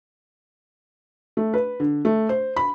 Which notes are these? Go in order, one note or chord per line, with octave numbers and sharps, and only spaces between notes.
A3
B4
D3
A3
C5
B5